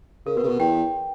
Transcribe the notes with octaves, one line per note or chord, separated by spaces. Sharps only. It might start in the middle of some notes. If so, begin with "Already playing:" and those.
C#3 A#4
B2 B4
C#3
B2
E2 G5